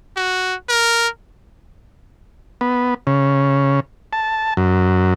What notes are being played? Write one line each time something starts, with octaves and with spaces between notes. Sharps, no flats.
F#4
A#4
B3
C#3
A5
F#2